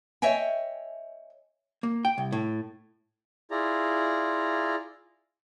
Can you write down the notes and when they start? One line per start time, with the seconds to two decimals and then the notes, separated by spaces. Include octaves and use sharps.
0.22 C#5 D#5 E5 G5 G#5
1.83 A#3
2.05 G5
2.18 C2
2.32 A2
3.51 E4 F4 G#4 D5 A#5